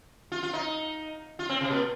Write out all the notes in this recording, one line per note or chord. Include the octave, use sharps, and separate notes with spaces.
F4
F4
D#4
F4
C4
C3
A#2